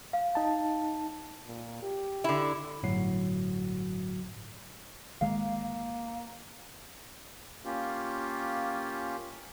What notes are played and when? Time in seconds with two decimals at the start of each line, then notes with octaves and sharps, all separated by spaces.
0.13 F5
0.35 D#4 A5
1.46 A#2
1.83 G4
2.24 D3 E4
2.83 G1 A2 F#3 F#4 C7
5.21 A1 D#3 G#3 A#3 F5
7.65 A#3 C#4 F4 G4